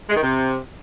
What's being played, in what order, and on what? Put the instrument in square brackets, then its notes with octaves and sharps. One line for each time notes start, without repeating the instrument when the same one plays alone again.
[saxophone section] G#3
D#3
C3